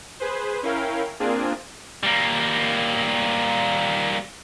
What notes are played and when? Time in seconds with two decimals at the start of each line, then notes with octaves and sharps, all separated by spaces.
0.20 G#4 B4 C5
0.63 C#4 E4 A#4 F5 G5
1.20 A#3 C4 D4 F4 G#4
2.04 G3 A#3